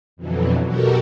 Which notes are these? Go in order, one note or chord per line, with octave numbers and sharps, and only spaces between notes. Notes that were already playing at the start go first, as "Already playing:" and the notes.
F2 B2 D3 E3 F#3
B2 F#4 G4 A4 A#4